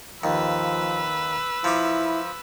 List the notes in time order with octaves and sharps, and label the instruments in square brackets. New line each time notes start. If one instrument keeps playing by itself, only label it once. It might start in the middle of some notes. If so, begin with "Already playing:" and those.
[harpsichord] D#2 [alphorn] F3 [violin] B4 E6
[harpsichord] F3 D6 [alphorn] E4